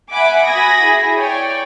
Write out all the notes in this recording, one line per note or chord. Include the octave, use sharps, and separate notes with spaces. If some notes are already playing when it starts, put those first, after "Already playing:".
E5 F#5 G#5 B5 D6
F#4 G#5 B5 D#6 G#6 A#6
E4 G#4
C#5 D5 G5